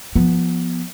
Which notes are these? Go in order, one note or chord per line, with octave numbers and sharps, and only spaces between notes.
F3 B3